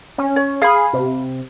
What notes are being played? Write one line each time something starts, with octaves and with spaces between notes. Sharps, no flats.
C#4
C#5
G#4 F5 B5
C3